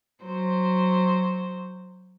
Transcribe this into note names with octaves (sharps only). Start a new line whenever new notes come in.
F#3 C5